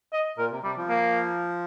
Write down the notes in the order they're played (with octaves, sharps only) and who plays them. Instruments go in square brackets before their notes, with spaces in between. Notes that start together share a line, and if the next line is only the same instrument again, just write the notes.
[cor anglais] D#5
[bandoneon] A#2 [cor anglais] A#4
[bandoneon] C3
[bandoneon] C3 [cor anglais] G3
[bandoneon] F3
[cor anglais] A#3